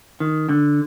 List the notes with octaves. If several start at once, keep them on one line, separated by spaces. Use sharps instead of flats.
D#3
D3